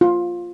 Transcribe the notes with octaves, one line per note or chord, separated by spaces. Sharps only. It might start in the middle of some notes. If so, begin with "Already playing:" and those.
F4